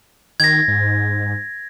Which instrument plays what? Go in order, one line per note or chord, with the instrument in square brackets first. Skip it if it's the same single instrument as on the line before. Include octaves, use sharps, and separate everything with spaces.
[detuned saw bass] D#3 [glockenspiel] G#6 A#6
[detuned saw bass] G#2